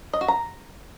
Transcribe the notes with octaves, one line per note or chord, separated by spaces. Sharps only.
D#5
F#4
A#5